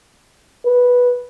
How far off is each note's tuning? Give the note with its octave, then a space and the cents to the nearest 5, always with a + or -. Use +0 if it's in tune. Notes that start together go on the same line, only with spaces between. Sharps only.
B4 -5